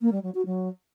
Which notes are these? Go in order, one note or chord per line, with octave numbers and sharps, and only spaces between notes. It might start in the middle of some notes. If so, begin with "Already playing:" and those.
A#3
G3
F#3
F#4
F#3